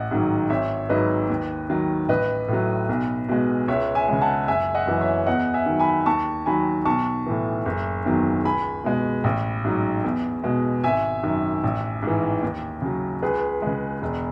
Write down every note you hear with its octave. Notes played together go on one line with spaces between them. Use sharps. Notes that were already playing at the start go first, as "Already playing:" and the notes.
Already playing: A1 D#5 F#5
G#2 D#3 F#3
G#1 C#5 E5
G#2 F#3 B4 D#5
D#2
D#3 F#3
A1 B4 D#5
A2 F#3
B1
B2 G#3
C#2 C#5 E5
E5 G#5
C#3 G#3
F#5 A5
F#1 E5 G#5
D#5 F#5
F#2 E3
C#5 E5
E2 D#5 F#5
E5 G#5
D#3 F#3
G#5 B5
D#2 A5 C#6
D#3 F#3 G#5 B5
B1 A5 C#6
A2 E3
F#1
E2 D#3 F#3
C#2 G#5 B5
B2 G#3
A1
G#2 F#3
E2
B2 G#3
G#1 E5 G#5
F#2 D#3
A1
G#2 E3
D#2
C#3 F#3
C#2 G#4 B4
C#3 G#3
E1